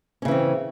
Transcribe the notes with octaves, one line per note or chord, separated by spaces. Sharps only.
C#3 E3 C4 C#4